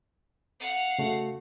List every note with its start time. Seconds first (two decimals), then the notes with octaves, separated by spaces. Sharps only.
0.60 F5 F#5
0.99 C#3 A3 F#4